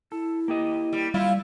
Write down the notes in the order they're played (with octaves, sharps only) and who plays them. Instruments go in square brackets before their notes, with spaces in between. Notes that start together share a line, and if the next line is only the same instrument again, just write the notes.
[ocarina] E4 [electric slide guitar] A4
[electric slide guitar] A#3 G4 D#5
[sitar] G3
[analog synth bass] G3 [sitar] E4 F4